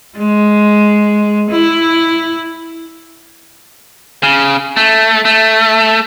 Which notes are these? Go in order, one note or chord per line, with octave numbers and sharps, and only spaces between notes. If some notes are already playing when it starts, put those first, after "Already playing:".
G#3
E4
C#3
A3
A3